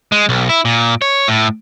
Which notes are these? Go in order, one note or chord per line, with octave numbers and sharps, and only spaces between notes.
G#3
B1
E4
A#2
C#5
A2